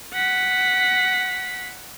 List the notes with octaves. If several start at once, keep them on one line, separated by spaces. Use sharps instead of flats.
F#5 B6